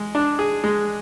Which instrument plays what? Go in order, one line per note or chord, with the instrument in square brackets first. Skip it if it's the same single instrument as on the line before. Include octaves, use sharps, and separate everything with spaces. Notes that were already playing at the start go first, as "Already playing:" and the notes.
Already playing: [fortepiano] G#3
D4
G#4
G#3